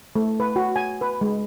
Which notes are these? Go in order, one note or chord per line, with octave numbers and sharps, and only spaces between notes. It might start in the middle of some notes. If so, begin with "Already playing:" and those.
A3
B4
F#4
G#5
B4
G#3